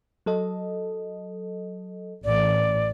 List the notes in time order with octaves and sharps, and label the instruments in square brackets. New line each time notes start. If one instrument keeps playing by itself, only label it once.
[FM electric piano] F#3 A4 D#5
[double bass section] A1 [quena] D5